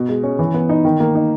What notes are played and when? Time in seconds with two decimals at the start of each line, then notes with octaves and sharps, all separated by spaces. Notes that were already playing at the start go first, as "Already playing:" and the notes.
Already playing: B2
0.09 G#3
0.23 C#4
0.39 E3
0.54 B3
0.69 D#4
0.85 D#3
1.00 A#3
1.15 D#4